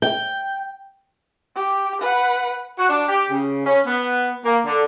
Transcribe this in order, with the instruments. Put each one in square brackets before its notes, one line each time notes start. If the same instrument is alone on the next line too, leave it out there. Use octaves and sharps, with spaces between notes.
[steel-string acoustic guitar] G5
[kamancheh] G4
B4 F#5
[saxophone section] F#4
D4
G4
C#3
C#4
B3
A#3
D3